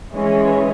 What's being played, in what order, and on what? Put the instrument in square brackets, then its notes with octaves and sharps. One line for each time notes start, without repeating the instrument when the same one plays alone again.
[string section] E3 G#3 C#4